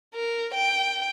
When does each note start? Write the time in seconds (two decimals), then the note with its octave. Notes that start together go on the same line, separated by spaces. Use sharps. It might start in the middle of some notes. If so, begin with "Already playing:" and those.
0.14 A#4
0.54 G5